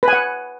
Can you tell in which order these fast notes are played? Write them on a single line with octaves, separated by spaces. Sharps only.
B4 G#5 F#5